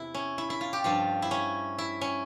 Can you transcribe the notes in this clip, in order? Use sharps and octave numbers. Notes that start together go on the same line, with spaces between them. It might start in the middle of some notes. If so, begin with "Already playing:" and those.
Already playing: E2 C3 E3 E4
C#4
E4
E4
F4
G4
G2 F3 F4
E4
C#4
E4
C#4